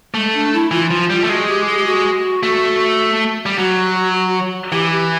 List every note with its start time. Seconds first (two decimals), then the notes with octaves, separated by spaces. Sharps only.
0.14 G#3 A3
0.34 D4
0.53 E4
0.71 E3 F4
0.91 F3
1.10 G3
1.24 A3
1.29 G#3 F#4
1.48 G4
1.67 G#4
1.77 G4
1.86 F#4
2.43 A3
3.46 G3
3.58 F#3 F#4
4.72 E3 G4
4.91 G4